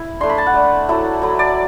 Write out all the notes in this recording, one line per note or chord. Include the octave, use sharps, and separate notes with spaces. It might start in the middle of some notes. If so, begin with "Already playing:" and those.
Already playing: E4
A3 D4 C6
B5
A5
F#5
A3 D4
F#3 A3 E4
F#3 A3 E4
D5